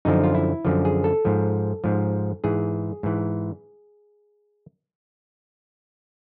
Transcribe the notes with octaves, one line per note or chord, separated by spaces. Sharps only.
F#2 D3 F3 D#4
F4
E4
F#2 D3 F3
G#4
A4
G#2 F3
G#2 F3
G#2 E3 G#4
G#2 E3